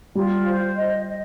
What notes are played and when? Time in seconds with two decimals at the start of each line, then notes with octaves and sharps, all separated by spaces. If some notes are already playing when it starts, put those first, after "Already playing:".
0.15 G3 F4
0.46 C5
0.76 D#5
1.07 D#5